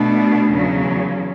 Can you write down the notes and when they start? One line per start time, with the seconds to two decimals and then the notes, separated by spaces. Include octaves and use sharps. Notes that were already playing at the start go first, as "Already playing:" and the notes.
Already playing: B2 A3 D4
0.52 E2 C#3 F#3